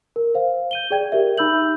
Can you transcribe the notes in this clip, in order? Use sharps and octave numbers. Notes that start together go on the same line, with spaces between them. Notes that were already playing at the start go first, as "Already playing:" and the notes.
A#4
C5 F5
G6 D#7 G7
G#4 D5 G5 G#6
G4 A#4 E5
D#4 B5 E6 G6 F#7